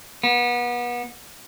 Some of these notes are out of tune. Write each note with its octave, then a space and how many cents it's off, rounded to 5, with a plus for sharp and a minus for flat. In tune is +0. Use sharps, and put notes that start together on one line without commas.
B3 -30